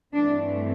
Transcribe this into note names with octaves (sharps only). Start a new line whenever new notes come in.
G2 E3 A3 C4 D4